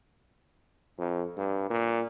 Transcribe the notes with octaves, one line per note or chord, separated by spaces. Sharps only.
F2
G2
A#2